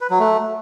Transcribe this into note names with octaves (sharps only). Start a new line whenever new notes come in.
B4
F#3
A3